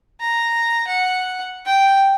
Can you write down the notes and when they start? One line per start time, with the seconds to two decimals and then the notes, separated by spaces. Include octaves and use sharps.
0.20 A#5
0.87 F#5
1.65 G5